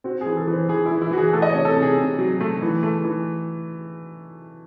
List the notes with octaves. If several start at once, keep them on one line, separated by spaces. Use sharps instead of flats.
C4 F#4
G#4
E3
A4
E3
C5
E3 G#4
E4
E3
E4
E3 F#4
G#4
A3 A4
D#5
C#5
C3
A4
C3
G#4
C3
F#3
A3
E3
A3
E3